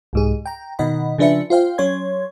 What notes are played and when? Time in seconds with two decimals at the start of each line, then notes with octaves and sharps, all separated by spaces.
0.13 C2 G#2 G#4
0.46 G5 A#5
0.79 B2 D#3 D#5 F#5 B5
1.18 C#3 F3 D4 B4 E5 C#7
1.50 F4 C5 F5 G5
1.78 F#3 C#4 C#5 C6 G#6